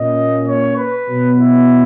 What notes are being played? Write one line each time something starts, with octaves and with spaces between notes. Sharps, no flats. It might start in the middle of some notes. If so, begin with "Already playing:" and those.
Already playing: A#2 A#3 C#4 D#5
C#5
B4
B2 F#3 B3
E4